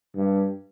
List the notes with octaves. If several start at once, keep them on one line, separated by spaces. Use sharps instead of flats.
G2